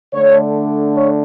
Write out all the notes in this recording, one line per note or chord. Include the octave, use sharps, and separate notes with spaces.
D3 A3 D4 C#5
C#5